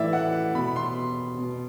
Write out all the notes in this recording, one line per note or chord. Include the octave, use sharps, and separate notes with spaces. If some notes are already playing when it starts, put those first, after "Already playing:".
Already playing: A2 E3 D5 E5
F#5
B2 B5
C6
B2